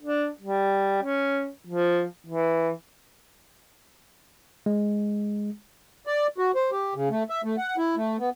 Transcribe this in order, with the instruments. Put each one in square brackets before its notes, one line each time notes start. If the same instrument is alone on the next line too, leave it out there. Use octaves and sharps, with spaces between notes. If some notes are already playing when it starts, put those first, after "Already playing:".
[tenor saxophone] D4
G3
C#4
F3
E3
[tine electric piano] G#3
[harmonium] D5
F#4
C5
G4
C#3
A3
E5
A3
F#5
E4
A3
B3